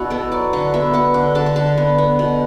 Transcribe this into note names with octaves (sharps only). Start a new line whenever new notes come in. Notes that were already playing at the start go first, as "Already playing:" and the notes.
Already playing: B2 D4 E4 F#4
B3 A4
F#3 D5
D3 F#5
B3 E5
B3 F#5
D3 F#5
D3 A5
F#5
D3 A5
B3
B3
B2